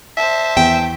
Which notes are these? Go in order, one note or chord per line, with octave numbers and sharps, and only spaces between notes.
C5 E5 A5
E2 G5